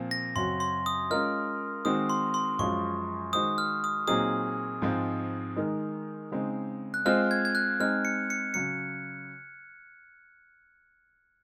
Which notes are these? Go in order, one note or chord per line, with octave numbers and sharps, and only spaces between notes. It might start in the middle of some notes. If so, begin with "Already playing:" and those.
Already playing: A#2 F3 C4
A#6
F#2 C#3 F#3 C4 F#4 C6
C6
D#6
G#3 C#4 F4 A#4 D#5 F6
D#3 G#3 C4 F#4 D#6
C6
C6
F#2 F3 G#3 C#4 F4 C#6
D#3 G#3 D#4 F#4 C5 D#6
F6
D#6
A#2 F#3 C4 D#4 G#4 D#6
G#2 F3 G#3 C4
D#3 G#3 D#4 A#4
C#3 G#3 C4 D#4
F#6
G#3 C4 F4 C5 D#5 F6
G#6
G#6
F#6
G#3 C4 D#4 F6
C#7
C#7
C#3 F#3 C#7